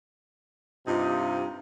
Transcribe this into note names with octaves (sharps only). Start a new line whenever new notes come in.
G2 C3 D#4 F4